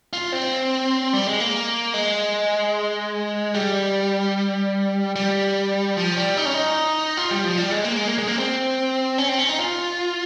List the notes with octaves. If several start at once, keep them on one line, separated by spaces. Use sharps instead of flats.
F4
C4
G3
G#3
A#3
G#3
G3
G3
F3
G3
D#4
C#4
D#4
F4
G3
F3
G3
G#3
A#3
G#3
A#3
G#3
A#3
C4
C#4
C4
C#4
D#4
F4